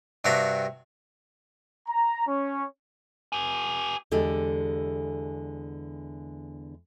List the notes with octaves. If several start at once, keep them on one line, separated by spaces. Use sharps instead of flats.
G2 C3 D4 F#4 A#5 B5
A#5
C#4
G4 G#5
E2 D3 G#3 G4 A4